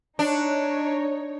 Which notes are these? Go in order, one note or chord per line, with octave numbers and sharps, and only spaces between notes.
D4 D#4 C#5